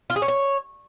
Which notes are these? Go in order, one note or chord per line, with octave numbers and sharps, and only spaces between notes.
F4
G#4
C#4
C#5